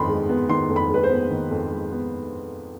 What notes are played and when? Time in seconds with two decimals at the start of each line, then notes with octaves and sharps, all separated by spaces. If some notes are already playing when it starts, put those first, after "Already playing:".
Already playing: F2 D#3 B3 B5 C6
0.09 G#3
0.29 B3
0.49 D#3 C6
0.70 F2
0.76 B5
0.90 G#3 B4
1.03 C5
1.10 B3
1.31 D#3
1.51 F2
1.71 G#3
1.92 B3